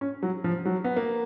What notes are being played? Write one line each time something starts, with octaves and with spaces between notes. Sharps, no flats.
C#4
F#3
F3
F#3
B3
A#3